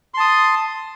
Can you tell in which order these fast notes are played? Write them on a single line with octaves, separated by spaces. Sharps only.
C6 A5 D#6